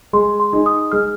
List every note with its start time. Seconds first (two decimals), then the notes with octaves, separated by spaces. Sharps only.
0.13 G#3 C6
0.40 C6
0.53 D#4 G#4
0.66 D#6
0.92 G#3 F6